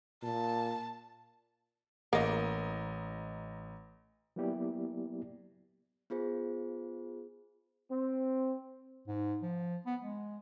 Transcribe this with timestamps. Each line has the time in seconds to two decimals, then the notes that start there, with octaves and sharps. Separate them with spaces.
0.23 A#2 A5
2.13 A1 A#3 D#5
4.36 F#3 A#3 B3 E4 G4 D5
6.10 B3 F4 G#4 C5
7.91 C4
9.07 G#2
9.42 F3
9.86 B3
10.02 G#3